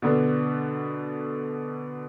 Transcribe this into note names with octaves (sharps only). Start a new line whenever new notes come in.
B2 D3 B3 D4